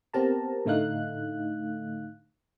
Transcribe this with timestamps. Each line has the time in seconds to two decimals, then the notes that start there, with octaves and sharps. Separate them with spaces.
0.14 B3 C4 G4 A#4 A5 A#5
0.65 A2 D3 A3 D#4 F5 F#6